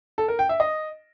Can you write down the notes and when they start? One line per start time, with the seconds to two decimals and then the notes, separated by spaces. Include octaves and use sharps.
0.18 A4
0.28 A#4
0.39 G5
0.49 E5
0.60 D#5